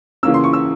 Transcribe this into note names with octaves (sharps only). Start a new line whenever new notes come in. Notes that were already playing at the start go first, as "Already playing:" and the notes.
C#3 E3 A#3 C#4 E6
C6
C#6
E6